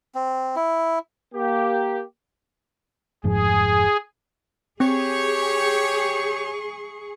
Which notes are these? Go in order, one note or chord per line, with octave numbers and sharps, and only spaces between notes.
C4
E4
A#3 G4
F1 G#2 F3 G#4
C4 G4 G#4 C#5 C#6